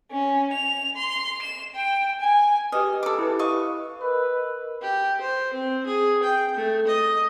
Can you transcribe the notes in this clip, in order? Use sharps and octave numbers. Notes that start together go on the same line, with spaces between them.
C#4
F7
C6
E7
G5
G#5
G4 B4 D#5 F6
A4 D6
E4 G4 B4
D#5 F5 C#6
A#4 B4 D#5 E6
G4
C5
C4
G#4
G5
A3
D#5